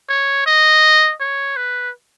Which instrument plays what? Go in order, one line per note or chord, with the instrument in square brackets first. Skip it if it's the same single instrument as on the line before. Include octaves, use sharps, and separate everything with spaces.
[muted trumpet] C#5
D#5
C#5
B4